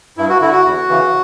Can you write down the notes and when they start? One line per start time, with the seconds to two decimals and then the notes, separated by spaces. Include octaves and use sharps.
0.17 G2 E4
0.30 F#4
0.41 D3 E4
0.53 F#4
0.65 E2
0.89 C#3 E3